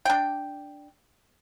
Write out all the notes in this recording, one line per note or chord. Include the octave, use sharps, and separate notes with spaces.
D4 G5